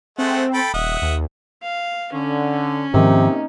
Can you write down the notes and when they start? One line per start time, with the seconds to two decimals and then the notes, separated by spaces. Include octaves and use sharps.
0.18 G#3 A3 C4 F#5
0.54 A4 G5 B5
0.74 D#1 D#5 E5 F#5
1.02 D#2
1.62 F5
2.13 D3 C#4
2.94 G#2 C3 D#3 F3 A#3 D#4